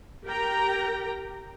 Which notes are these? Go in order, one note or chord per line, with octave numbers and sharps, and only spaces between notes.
G4 A#4 G5 A#5